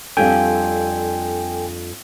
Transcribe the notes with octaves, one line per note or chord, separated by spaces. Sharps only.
F2 G3 D4 A4 G5 G#5